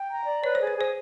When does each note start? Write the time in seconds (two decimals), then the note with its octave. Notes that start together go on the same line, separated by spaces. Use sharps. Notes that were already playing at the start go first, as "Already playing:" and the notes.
Already playing: G5
0.09 A#5
0.26 D5
0.43 B4 C#5
0.55 C5
0.61 G#4
0.67 B4
0.77 G#4 C5